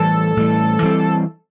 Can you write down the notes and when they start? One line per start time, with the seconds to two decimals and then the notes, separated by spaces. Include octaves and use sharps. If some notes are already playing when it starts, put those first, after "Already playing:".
Already playing: A2 E3 G3 A4
0.37 A2 E3 G3
0.82 E3 G3 C4